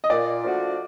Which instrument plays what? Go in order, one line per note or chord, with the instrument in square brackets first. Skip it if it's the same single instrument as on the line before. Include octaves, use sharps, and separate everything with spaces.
[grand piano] D#5
[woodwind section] A#2 [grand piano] D5
[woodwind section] F3 A3 D4 F#4